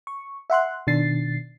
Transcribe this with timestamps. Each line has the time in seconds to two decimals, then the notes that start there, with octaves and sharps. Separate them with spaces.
0.07 C#6
0.50 E5 F#5 C6 F#6
0.87 B2 D#3 D4 A6 C7